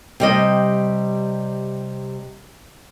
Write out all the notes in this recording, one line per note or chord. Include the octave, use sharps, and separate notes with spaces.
C3 G3 D#5